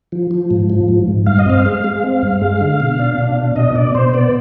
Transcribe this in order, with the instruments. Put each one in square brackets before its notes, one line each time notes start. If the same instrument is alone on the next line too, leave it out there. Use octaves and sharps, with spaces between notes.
[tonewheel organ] F3
F3
G#2
F3
G#2
G#2
G2 F5
D#5
C4 F5
G#3
G#3
C4
G2
G#3
D3
B2
D4
B2
D4
B2 D#5
B2 D5
B2 C5
B3 D5